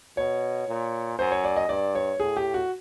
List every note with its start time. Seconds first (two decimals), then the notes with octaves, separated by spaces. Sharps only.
0.17 B2 C#5
0.68 A#2
1.19 F#2 C5
1.32 C#5
1.44 D5
1.56 D#5
1.69 G2 D5
1.95 C#5
2.20 A2 G#4
2.37 G4
2.54 F#4